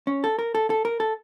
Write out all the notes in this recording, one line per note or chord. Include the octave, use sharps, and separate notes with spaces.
C#4
A4
A#4
A4
A4
A#4
A4